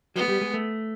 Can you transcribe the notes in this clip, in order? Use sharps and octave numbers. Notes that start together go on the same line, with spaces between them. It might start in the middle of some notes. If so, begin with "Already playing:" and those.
F#3 B3
G#3
G3
G#3
A3